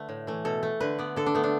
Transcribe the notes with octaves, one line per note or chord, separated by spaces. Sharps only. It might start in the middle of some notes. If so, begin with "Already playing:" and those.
Already playing: D3 A3 B4
A2
E3 A3
B2 A4
A3
D3 B4
B3 D5
D3 A4
D4
A3 B3
D4